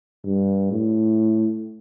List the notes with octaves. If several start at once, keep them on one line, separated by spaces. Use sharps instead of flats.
G2
A2